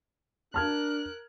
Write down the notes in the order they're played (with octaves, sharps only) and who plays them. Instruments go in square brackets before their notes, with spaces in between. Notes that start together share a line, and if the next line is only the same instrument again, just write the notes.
[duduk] D4 [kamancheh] A#4 F#6 [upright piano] A5 F6 G#6